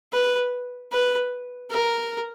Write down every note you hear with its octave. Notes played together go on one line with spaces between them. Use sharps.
B4
B4
A#4